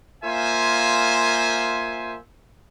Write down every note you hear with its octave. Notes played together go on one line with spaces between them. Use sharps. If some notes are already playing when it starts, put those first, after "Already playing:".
A#3 F4 C5 E5 G#5